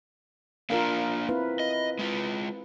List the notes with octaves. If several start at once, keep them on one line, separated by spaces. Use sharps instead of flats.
A#3 D4 F4 A#4 F5
C4 E4 B4
D#5
G#3 F4